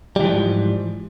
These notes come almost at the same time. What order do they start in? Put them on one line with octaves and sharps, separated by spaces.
G3 E3 F3 G#2